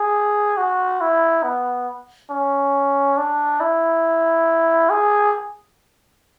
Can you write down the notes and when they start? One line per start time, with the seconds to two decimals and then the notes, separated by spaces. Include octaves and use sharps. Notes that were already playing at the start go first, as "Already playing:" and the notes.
Already playing: G#4
0.57 F#4
1.01 E4
1.43 B3
2.31 C#4
3.17 D4
3.60 E4
4.90 G#4